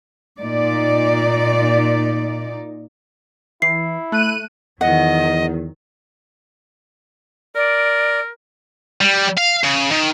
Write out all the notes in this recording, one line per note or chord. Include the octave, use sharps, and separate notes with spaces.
A#2 D#4 D5
E3 E4 C7
A3 F#6 D#7
E2 D#3 F#3 D#5 F#5
A#4 D5
G3
F5
C#3
D#3